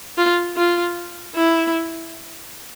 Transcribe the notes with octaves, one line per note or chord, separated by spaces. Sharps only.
F4
F4
E4